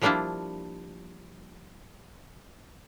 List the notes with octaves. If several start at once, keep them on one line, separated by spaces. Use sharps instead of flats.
F3 G3 A#3 D4 E4 F4